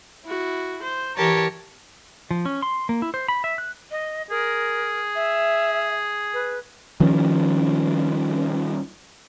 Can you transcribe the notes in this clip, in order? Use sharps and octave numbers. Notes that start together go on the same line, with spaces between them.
E4 F#4
C5
E3 G4 A#4 C#5 A5 A#5
F3
C#4
C6
A#3
E4
C5
B5
E5
F#6
D#5
G#4 A#4
E5
B4
D#3 F3 G3 C#4